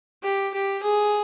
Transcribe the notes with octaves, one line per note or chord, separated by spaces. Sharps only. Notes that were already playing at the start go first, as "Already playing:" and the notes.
G4
G4
G#4